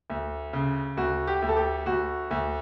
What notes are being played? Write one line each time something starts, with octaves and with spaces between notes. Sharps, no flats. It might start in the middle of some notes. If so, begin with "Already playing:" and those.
D2
C#3
D2 F#4
G4
D2
A4
G4
D2 F#4
D2